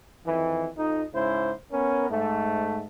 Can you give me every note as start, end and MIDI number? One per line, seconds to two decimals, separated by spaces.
0.25 0.67 41
0.25 0.67 51
0.25 0.67 52
0.76 1.02 41
0.76 1.02 63
1.13 1.52 44
1.13 1.52 49
1.13 1.52 64
1.13 1.52 72
1.71 2.09 59
1.71 2.09 61
1.71 2.09 70
2.09 2.84 44
2.09 2.84 57